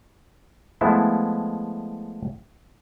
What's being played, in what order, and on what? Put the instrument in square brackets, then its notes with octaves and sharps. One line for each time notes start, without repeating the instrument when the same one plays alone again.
[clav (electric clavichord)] F3 G#3 A3 B3 E4 E5